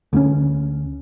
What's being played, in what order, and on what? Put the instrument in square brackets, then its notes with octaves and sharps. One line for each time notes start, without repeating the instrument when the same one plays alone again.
[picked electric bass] D2 A#3 C#4